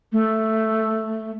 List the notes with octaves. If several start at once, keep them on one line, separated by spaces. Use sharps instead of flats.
A3